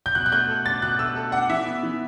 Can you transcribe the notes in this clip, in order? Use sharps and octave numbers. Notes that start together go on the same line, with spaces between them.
G6
B2 F#6
F#6
A3 G6
A4
D4 A6
B2 F#6
A3 E6
A4
D4 F#5
E3 E5
B3
E3